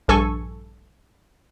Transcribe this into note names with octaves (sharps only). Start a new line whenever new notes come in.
A#1 G2 A4 G#5 C#6